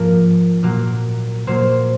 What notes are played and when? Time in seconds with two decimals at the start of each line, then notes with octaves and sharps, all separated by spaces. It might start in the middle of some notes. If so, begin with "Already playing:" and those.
Already playing: G#2 F3 A#3 A#4
0.63 A#2 F#3 A#3
1.47 A#2 F#3 A#3 C5